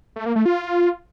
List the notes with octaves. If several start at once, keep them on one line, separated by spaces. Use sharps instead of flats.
A3
A#3
A3
F4